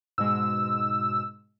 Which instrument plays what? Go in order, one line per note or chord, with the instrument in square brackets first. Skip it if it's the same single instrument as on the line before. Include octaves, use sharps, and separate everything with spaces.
[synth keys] G#2 B2 G#3 [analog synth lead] E6